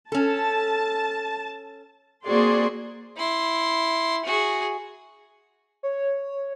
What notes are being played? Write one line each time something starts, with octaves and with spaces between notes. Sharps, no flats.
C#4 A4 A5
A#3 C4 F#4 G#4 D5 C6
E4 C6
F#4 G#4
C#5